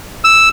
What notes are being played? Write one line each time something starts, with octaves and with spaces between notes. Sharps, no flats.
E6